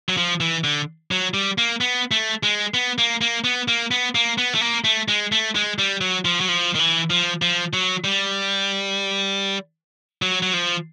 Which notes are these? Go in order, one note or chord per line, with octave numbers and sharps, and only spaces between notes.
F#3
F3
E3
D3
F#3
G3
A#3
B3
A3
G#3
B3
A#3
A#3
B3
A#3
B3
A#3
B3
A3
A#3
A3
G#3
A3
G#3
G3
F#3
F3
F#3
F3
D#3
E3
F3
F3
F#3
G3
F#3
F#3
F3